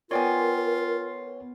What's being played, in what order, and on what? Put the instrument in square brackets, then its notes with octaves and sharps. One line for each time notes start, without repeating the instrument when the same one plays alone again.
[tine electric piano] B3 C#5 [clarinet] F4 [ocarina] A#4 [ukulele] D5 G5 G#5